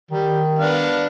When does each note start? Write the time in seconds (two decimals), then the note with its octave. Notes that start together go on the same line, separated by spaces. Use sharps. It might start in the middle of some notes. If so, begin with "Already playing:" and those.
0.11 D#3 G3
0.59 B3 D4 F5